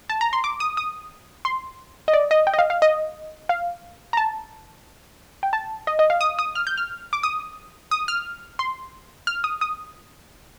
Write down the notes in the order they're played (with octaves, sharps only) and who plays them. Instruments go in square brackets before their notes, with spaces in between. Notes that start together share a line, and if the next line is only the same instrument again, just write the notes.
[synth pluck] A5
A#5
C6
D6
D#6
D#6
C6
D#5
D5
D#5
G5
D#5
F5
F5
D#5
F5
A#5
A5
G5
A5
D#5
D#5
F5
D#6
D#6
F6
G6
F6
D6
D#6
D#6
F6
C6
F6
D#6
D#6